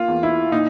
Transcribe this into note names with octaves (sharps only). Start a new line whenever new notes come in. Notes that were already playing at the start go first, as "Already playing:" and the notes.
Already playing: A#3 F4
E2
E4
A#2 D#4